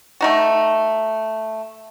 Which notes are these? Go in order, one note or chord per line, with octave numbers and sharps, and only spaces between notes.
A3 D#4 F#4